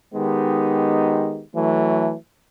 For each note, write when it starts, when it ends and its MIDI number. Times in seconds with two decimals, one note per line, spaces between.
0.15 1.43 51
0.15 1.43 56
0.15 1.43 59
0.15 1.43 63
0.15 1.43 67
1.56 2.14 52
1.56 2.14 54
1.56 2.14 57